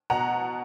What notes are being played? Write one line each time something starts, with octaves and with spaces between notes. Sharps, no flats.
B2 F#5 A#5